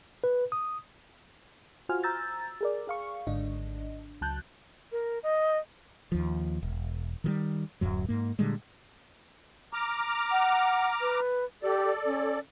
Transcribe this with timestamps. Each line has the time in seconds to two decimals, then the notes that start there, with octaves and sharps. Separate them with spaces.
0.24 B4
0.52 D#6
1.89 F4 F#4 C5 G#5 F6
2.04 A#5 E6 G6 A6
2.61 G#4 A#4 D5
2.87 G#4 F5 C#6
3.27 G#1 G#2 D3 D4 D#5
4.21 C#2 F#3 A5 F#6 G6
4.91 A#4
5.23 D#5
6.12 D#2 F3
6.63 E1
7.24 D#3 E3 G3
7.81 D1 F#2 F#3
8.09 G#2 A#3
8.39 A#2 D3 G3 G#3
9.73 A#5 D6 F6
10.31 F#5
11.01 B4
11.63 G4 A4 D5
12.05 C#4